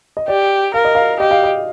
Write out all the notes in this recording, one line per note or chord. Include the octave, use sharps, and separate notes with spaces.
D#5
G4 D5
A#4 F5
D#5
F5
G4 D#5
F5
D#5